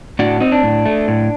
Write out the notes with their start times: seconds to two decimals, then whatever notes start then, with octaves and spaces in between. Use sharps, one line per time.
0.19 A2 D4 F#4
0.41 C4 D#4
0.52 D4
0.63 A2
0.86 A3
1.08 A2